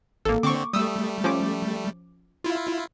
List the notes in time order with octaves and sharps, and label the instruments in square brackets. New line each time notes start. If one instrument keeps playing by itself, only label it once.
[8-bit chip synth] G#1 [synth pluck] A#3 A4
[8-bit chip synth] D3 C4 [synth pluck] C#6 D6
[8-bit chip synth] G3 A3 [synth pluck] D#6 E6
[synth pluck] F3 C#4 D6
[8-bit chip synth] E4 F4